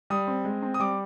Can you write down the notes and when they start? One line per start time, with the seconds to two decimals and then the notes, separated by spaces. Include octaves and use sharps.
0.10 G3 D#6
0.28 C4
0.45 G#3
0.62 C4
0.74 D#6
0.80 G3 D6